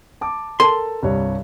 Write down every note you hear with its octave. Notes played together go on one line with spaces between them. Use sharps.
A5 D6
A4 A#4 A5 C6
C2 G2 C#5